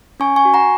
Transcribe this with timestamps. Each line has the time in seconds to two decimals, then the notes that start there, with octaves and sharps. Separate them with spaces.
0.20 C#4 G#5 C#6
0.36 G#5 C#6
0.45 F#4
0.54 F#5 A#5